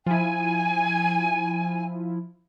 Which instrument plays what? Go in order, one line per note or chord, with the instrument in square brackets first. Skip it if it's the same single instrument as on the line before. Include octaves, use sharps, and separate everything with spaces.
[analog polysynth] F3 E4 [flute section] G#5